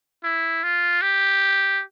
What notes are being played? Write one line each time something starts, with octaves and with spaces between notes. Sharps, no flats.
E4
F4
G4